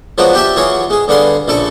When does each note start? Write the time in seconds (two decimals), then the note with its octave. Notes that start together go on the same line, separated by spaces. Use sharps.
0.18 F3 F#3 G#3 B3 D4 F#4
0.34 D4 G4 D5 E5
0.56 E3 F#3 F4 G#4 C#5
0.90 G#3 G#4
1.08 G2 D3 B3 G#4 F5 C6
1.48 A#1 C#3 A4 D5 C#6